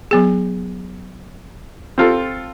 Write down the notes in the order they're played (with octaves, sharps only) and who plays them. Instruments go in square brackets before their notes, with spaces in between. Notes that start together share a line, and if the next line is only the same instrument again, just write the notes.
[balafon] F#3 B3 G#4
[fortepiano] C4 F4 A4